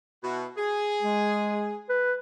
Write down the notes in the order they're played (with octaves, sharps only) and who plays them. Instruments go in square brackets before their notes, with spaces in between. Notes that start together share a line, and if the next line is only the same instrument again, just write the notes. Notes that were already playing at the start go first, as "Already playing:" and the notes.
[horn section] B2 E4 F#4
G#4
[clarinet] G#3
B4